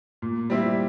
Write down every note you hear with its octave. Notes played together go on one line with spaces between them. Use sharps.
A#2
G3 C4 E4